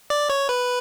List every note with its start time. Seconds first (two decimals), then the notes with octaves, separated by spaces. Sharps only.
0.10 D5
0.29 C#5
0.49 B4